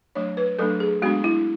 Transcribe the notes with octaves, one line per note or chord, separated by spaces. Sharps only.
F#3 A3 D4 C#5
B4
F#3 A3 D4 A4
G#4
G#3 B3 D4 F#4
E4